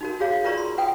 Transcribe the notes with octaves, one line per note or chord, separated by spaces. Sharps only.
D#4 F#4 A#4
F#4 G#4 C#5 F5
F4 A#4 B4 D5 A#5 C#6
C6
B4 F#5 G5 D#6